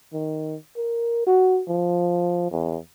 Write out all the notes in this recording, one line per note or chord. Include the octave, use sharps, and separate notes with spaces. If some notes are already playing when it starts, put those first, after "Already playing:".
D#3
A#4
F#4
F3
E2